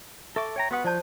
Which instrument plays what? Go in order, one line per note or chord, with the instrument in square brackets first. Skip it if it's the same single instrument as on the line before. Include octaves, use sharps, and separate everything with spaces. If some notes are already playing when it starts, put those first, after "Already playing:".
[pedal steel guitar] A4 D6 [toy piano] E5 C#6
[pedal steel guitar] C#5 G5 A#5
[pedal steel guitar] B3 B4 F#5 [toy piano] F#4 G4 D#6
[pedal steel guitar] F3 G6 [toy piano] C5 D5 A5